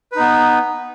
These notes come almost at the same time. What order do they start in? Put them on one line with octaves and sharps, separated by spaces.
B4 D#4 B3